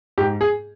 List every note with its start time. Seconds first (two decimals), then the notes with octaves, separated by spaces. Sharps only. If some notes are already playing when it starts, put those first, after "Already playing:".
0.18 G#2 G4
0.41 G#4